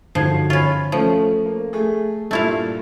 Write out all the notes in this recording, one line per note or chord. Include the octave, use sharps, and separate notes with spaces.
G2 D3 F3 F#3 D#4 G#6 C7
C#4 F4 C#5 B5
F3 A3 C#4 A4
A#3
A3 G#4
G2 A#2 A3 E4 F5